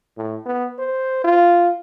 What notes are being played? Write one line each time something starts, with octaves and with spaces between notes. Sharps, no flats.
A2
B3
C5
F4